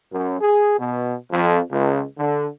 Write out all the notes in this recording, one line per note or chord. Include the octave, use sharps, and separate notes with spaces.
F#2
G#4
B2
F2
C#2
D3